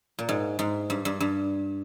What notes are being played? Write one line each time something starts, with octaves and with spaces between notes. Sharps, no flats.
A#2
G#2
G#2
G2
G2
G2